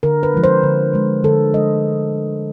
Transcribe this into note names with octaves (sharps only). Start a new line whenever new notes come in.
D3 A#4
B4
F3 G#3
C5
D3
F3 G#3
D3 A4
F3 G#3 D#5